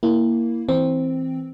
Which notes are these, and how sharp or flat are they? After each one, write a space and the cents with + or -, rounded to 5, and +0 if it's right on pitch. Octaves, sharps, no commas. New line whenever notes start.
A#3 +0 E4 +0
E3 -15 C4 +0